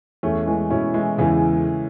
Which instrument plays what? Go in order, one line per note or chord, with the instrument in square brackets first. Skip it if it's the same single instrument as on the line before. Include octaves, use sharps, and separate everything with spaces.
[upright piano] E2 [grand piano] A3 C#4
[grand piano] E3 G#3
[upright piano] B2 [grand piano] C#4 E4
[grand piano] E3 G#3
[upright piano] E2 [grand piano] C#3 E3